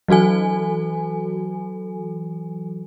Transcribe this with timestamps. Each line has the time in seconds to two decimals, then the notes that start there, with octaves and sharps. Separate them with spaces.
0.08 E3 F#3 F#4 A4 G#5